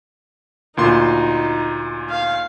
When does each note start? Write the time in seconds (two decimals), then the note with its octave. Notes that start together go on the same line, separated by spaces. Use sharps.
0.77 D2 A#2 D#4 C6
2.10 F5